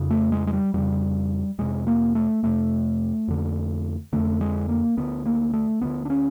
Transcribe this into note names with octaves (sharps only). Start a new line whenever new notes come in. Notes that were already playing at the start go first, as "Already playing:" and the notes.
Already playing: F2 C#3
A3
G#3
G#3
G3
F2 C#3 G3
F2 C3 G#3
A#3
A3
F2 C3 A3
F2 D3
F2 D3 A3
G#3
A#3
D2 D3 B3
A#3
A3
D2 D3 B3
D4
C#4